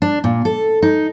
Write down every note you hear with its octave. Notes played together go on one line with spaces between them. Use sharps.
D4
A#2
A4
D#4